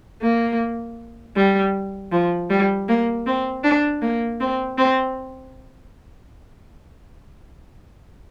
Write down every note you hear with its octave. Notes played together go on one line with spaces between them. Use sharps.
A#3
G3
F3
G3
A#3
C4
D4
A#3
C4
C4